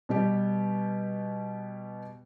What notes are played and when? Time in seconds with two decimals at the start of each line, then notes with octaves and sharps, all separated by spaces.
0.09 B2 G3 G4